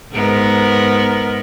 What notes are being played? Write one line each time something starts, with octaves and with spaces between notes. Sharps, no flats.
G#2 B3 A#4